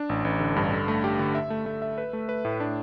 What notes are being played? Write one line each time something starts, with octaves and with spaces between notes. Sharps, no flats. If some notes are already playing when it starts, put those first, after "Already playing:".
Already playing: D4
A1
A1
D3
G2
D3
A3
G4
D3
E5
A3
A3
E5
B4
A3
B4
A2
D4